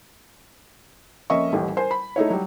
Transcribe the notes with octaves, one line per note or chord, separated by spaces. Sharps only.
F2 A#3 C#4 D#5 E5 C#6
D#1 A1 A2 G4
A#4 C5 G#5
B5
A3 D#4 E4 C#5
F#3 G3